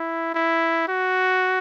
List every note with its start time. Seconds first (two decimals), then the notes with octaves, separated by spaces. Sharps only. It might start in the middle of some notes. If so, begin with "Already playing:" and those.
Already playing: E4
0.34 E4
0.88 F#4